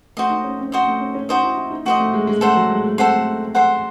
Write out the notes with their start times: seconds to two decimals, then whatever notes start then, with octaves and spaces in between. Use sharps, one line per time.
0.17 A3 F#4 C5 D#5
0.30 D#4
0.44 C#4
0.59 C4
0.72 C4 F#4 C5 D#5
0.87 A3
1.01 C#4
1.15 C#4
1.29 D#4 F#4 C5 D#5
1.43 E4
1.57 E4
1.71 D#4
1.85 A3 F#4 C5 D#5
2.00 A3
2.14 G#3
2.27 G#3
2.41 A3 A4 C5 F#5 C6
2.56 F#3
2.70 G#3
2.84 A3
2.98 C4 A4 C5 F#5 C6
3.16 A3
3.55 A4 C5 F#5 C6